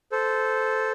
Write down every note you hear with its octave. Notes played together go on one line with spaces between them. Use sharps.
A4 C5